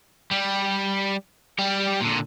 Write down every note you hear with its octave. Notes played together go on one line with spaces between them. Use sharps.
G3
G3 G4
A#2 D3